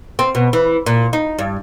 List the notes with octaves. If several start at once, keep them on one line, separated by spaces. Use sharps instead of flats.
C4
B2
E3
A#2
D#4
G2